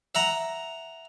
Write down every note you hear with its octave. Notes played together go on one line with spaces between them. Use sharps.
E5 F#5 A#5